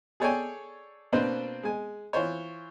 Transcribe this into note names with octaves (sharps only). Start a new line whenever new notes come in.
G#4 A4 C#5 D5 G5 G#5
B2 A#3 C4 D4 B4 C5
G#3 G#5
E3 F4 C5 C#5